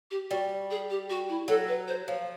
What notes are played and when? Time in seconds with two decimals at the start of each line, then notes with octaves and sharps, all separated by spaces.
0.11 G4
0.30 G3 F#4
0.70 G#4
0.90 G4
1.10 F#4
1.29 E4
1.48 F#3 A4
1.68 B4
1.88 C5
2.07 F3 C#5